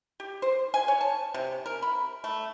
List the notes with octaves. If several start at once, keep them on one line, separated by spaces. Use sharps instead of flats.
G4
C5
G#5
C#5
A5
C3
A#4
B5
A3